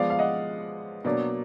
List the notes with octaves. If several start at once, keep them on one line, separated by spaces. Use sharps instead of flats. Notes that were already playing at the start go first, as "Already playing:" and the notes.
Already playing: F3 G#3 B3 D5 F5
F5
D#5 F#5
B2 F#3 A#3 D4 D5